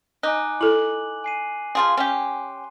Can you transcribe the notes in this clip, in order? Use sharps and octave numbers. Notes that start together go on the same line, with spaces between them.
D#4 G#5 D6 F#6
E4 A4 D6 F#7
G#5 C7 D#7
F3 F4 G#4 C6
C#4 G4